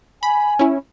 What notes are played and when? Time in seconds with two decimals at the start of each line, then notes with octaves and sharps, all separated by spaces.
0.23 G#5 B5
0.59 C#4 E4